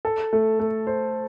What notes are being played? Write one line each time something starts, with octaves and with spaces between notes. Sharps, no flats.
A4
A3
A3
C5